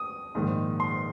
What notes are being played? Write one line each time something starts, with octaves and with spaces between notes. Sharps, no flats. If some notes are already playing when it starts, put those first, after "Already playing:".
Already playing: D#6
A#1 G#2 D#3
C6